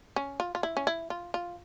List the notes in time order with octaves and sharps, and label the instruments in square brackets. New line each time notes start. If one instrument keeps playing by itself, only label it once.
[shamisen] C#4
F4
F4
E4
C#4
E4
F4
F4